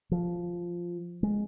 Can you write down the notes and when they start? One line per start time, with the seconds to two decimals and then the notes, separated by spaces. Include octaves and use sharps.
0.12 F3
1.23 G#3